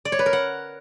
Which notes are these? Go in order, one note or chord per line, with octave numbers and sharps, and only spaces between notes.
D5
C#5
B4
A#4
F#5